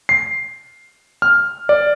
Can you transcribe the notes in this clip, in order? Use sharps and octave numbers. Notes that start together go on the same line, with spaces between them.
C7
F6
D5